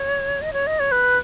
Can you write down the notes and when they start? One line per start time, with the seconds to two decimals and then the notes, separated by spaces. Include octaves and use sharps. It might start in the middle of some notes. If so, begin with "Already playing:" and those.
Already playing: C#5
0.42 D#5
0.53 C#5
0.67 D#5
0.80 C#5
0.92 B4